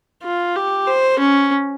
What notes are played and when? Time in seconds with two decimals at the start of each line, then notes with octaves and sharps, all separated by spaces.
0.23 F4
0.55 G4
0.87 C5
1.19 C#4